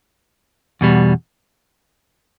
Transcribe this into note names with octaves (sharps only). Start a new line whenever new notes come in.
E2 B2 G3